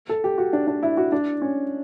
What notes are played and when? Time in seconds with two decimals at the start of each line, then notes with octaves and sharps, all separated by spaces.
0.09 A4
0.24 G4
0.38 F#4
0.53 D4
0.67 D4
0.83 E4
0.97 F#4
1.12 D4
1.42 C#4